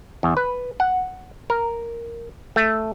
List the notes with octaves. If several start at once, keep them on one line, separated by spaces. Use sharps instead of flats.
E2
B4
F#5
A#4
A3